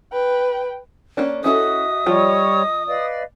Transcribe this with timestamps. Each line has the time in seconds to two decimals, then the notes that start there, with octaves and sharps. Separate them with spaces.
0.12 B4 G5
1.17 A#3 C#4 D4
1.44 C#4 E4 F#4 A4 D#5 E5 D#6
2.06 F3 G3 F4 C#5 D#5
2.88 B4 D5 D#5 F5